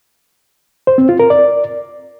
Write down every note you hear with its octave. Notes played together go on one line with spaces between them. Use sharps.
C5
C4
F4
A#4
D5